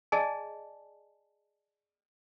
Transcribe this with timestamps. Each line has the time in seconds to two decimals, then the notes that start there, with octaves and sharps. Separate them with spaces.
0.12 G#4 D5 D#5 G#5 A5